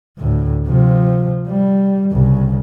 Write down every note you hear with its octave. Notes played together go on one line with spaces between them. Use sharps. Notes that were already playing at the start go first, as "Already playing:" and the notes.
D2 A2
C3 F3
G3
C2 C#3